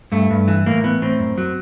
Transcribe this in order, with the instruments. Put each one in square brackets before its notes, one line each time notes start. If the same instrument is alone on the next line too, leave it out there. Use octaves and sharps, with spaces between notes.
[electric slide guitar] G2 A3
G2
E3
A2 A#3
E3 B3
A2 C4
F#2
F#3